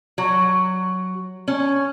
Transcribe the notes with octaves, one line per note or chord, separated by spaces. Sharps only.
F#3
C#4